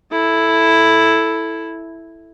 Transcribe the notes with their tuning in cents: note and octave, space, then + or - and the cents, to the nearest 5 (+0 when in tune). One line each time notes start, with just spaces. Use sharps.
E4 +0 A4 +0